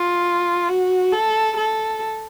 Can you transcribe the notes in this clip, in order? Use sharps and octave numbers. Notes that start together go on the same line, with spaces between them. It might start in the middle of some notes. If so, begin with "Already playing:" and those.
Already playing: F4
F#4
A4
A4